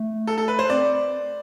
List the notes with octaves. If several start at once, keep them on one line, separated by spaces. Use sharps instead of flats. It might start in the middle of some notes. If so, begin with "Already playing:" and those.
Already playing: A3
A4
A4
B4
C5
C4 D5